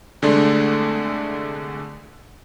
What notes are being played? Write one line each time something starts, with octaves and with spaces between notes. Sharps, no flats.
C2 D3 G#3 A3 D4 C6